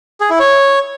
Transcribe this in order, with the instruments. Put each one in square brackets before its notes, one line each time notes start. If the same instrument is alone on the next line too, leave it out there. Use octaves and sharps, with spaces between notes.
[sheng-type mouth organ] G#4
E4
C#5